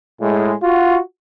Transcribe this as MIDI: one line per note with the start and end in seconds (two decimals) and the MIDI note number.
0.21 0.53 45
0.21 0.53 56
0.61 0.98 65
0.61 0.98 66